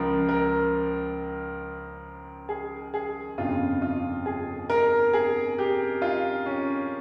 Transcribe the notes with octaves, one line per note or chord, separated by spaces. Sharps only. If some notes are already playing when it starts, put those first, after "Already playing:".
Already playing: C#2 C#3 F3 A#4
A#4
G#4
G#4
G1 F2 C#3 F4
F4
G#4
A#4
G#4
G4
F4
C#4